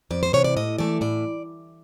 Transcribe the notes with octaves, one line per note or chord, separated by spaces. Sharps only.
F2 D5
C5
C3 E3 C#5
D5
A2 D#5
E3 A3 D5
A2 D5